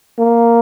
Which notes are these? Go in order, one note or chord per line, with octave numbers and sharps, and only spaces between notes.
A#3